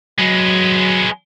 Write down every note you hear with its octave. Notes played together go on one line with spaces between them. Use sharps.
F#3 G#3 B3